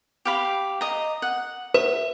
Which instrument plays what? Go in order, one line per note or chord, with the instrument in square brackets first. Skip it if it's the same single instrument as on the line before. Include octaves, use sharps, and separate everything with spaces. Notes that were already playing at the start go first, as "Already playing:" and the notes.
[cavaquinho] G4 F5 B5
D#5 A#5
F#5
[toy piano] B4 [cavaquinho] E5